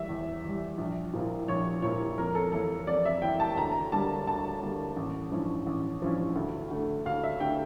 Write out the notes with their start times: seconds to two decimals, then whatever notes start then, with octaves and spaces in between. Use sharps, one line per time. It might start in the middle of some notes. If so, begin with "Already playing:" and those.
Already playing: E3 G3 E5
0.09 E2
0.44 E3 G3
0.78 A#1
1.13 A#2 F3 A#3 E4
1.48 A#1 C#5
1.82 A#2 F3 A#3 E4 C#5
2.18 F2 A#4
2.35 A4
2.52 E3 A#3 E4 A4
2.87 F2 D5
3.05 E5
3.22 E3 A#3 E4 G5
3.40 A5
3.57 D2 A#5
3.92 D3 G3 A#3 A5
4.27 D2 A5
4.62 D3 G3 A#3
4.97 A1
5.31 G2 F3 C#4 E4
5.67 A1
6.02 G2 F3 C#4 E4
6.36 D2
6.71 D3 A3
7.05 D2 F5
7.24 E5
7.40 D3 A3 G5